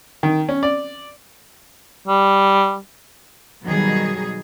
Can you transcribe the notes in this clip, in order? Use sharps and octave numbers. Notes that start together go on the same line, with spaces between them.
D#3
C#4
D5
G3
B2 D#3 F#3 G3 G#4